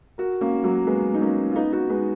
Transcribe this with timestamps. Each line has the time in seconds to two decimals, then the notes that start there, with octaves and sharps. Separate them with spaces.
0.18 F#4 A#4
0.41 A#3 C#4
0.64 F#3 A#3
0.87 G#3 B3
1.14 D#4
1.21 A#3 C#4
1.51 F4
1.55 B3 D#4
1.72 D#4 F#4
1.89 G#3 B3